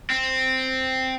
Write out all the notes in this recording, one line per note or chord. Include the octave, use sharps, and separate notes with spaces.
C4